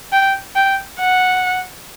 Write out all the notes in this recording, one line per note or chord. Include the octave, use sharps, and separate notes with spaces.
G5
G5
F#5